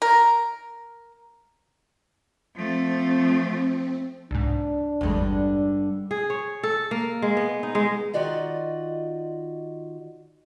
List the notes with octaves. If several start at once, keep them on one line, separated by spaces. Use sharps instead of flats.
A#4
F3 A3 C4
C2 G#2 D4
G#1 E2 G2 D3 G#3
G#4
C#5
A4
A#3
G#3
B3
D#4
G#3
D#3 F4 F#4 D5 D#5